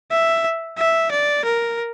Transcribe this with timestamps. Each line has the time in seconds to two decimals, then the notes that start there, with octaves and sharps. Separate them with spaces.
0.11 E5
0.78 E5
1.11 D5
1.45 A#4